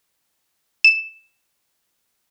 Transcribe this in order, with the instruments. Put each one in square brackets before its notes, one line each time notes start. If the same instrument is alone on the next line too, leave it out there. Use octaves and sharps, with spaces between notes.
[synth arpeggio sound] E7